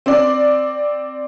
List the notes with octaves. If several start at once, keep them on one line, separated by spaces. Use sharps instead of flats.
C4 D5